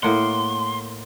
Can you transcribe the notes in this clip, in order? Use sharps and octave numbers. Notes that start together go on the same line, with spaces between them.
A2 A#3 F#5 C6